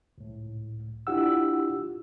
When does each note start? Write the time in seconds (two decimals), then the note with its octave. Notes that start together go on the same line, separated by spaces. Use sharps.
0.18 C#2 A2
1.07 D4 E4 F4 G4 F#5 E6